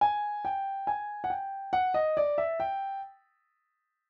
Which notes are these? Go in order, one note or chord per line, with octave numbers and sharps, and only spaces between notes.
G#5
G5
G#5
F#5
G5
F#5
D#5
D5
E5
G5